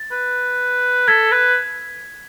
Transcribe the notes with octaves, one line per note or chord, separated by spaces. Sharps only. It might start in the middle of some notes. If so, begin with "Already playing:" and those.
Already playing: A6
B4
A4 G#6 B6
B4